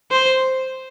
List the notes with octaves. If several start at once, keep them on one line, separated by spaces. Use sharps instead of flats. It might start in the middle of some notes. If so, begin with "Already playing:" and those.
C5